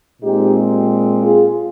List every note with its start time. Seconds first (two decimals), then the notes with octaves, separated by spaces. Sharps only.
0.21 A#2 G#3 C4 D#4 G4
1.23 F4 G#4